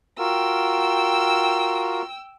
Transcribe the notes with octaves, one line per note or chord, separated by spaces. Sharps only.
F4 F#4 A#4 G5 E6